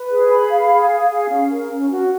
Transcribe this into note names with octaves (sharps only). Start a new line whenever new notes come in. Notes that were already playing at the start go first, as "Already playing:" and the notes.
Already playing: B4
G#4
B5
F5
G#4
G#4
F5
C#4
A#4
C#4
F#4